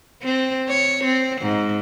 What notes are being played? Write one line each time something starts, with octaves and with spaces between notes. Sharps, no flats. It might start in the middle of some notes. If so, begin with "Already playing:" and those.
C4
C#5
C4
G#2